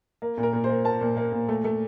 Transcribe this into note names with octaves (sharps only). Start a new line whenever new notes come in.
A#3
A#2
A#4
A#2
C5
A#3
A#3 A5
A#2
A#3
A#2
A3
A3